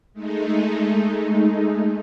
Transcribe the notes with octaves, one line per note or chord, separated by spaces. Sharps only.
G#3 A3 D#4